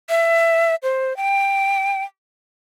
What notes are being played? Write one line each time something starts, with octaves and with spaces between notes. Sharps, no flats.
E5
C5
G5